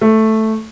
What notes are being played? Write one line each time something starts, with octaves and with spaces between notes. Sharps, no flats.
A3